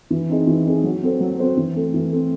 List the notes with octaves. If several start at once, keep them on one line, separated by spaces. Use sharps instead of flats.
E3
C4 D#4 G#4
E3
C4 D#4 G#4
F#3
C4 F#4 A4 C5
F#3
C4 F#4 A4 C5
E3
A3 C4
E3
A3 C4